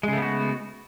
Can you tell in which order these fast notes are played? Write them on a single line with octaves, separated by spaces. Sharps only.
G#3 C#3 A3 B3 F#4